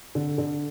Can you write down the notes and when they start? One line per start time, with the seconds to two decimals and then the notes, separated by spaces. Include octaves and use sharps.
0.15 D3
0.38 D3